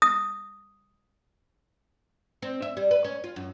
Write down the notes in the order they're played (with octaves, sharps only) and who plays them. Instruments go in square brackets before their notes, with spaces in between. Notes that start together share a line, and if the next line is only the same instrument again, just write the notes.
[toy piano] D#6
[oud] C4
E5
G3
B4
C#4
F4
F#2